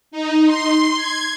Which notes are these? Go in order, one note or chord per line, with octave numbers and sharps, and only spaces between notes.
D#4
C6
G#6